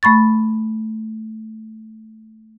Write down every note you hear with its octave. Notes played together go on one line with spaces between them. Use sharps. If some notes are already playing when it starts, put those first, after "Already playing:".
A3 B5 C#6 A6